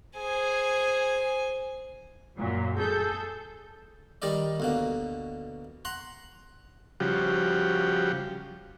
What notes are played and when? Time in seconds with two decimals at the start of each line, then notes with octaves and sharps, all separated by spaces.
0.17 G#4 C5 G#5
2.37 F#2 A#2 F#3
2.76 G#4 A4 G6
4.22 D#3 G3 D#4 D5 D#5
4.60 D2 B2 A#3
5.85 F#5 A#5 C6
7.00 C#3 F3 G3 F#4 G4